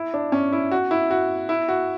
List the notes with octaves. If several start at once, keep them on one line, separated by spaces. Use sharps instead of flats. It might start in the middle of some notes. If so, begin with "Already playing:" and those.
Already playing: E4
D4
C#4
E4
F#4
E4
F#4
E4
F#4